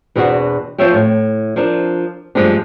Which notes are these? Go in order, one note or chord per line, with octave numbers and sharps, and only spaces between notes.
E2 B2 C4 D4 E4 F#4
F3 C4 F4 C#5 E5 G5
A2
F3 C4 D4 A#4
G2 F3 G#3 A3 C4 D4